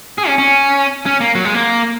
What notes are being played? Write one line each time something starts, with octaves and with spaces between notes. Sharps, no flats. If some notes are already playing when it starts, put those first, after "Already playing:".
G#4
C#4
C#4
C#4
A#3
F#3
G#3
A#3